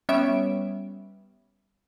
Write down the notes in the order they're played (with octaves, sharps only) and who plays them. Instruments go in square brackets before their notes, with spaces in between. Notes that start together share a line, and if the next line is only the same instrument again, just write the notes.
[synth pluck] G3 B3 C#4 C#5 E5 D7